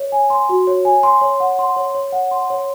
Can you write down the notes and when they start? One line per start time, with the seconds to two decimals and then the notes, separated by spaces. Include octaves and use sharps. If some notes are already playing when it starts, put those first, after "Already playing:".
Already playing: C#5
0.12 G#5
0.30 C6
0.49 F#4
0.67 C#5
0.85 G#5
1.03 C6
1.21 C#5
1.40 F#5
1.59 C6
1.76 C#5
1.95 C#5
2.12 F#5
2.31 C6
2.50 C#5